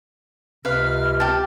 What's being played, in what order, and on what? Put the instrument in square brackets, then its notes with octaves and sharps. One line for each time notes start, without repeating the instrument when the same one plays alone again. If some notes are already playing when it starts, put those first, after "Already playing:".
[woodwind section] C#2 C3 F6 [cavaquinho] B4 F5
[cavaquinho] G4 A5